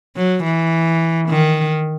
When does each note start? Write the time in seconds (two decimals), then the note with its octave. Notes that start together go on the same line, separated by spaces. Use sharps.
0.16 F#3
0.43 E3
1.29 D#3